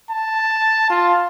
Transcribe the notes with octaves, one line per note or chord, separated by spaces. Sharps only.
A5
F4